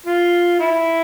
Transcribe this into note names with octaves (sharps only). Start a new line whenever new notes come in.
F4
E4